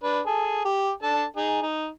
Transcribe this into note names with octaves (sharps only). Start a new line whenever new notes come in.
D4 B4
G#4 A4
G4
D4 A4 A5
D#4 G#4
D#4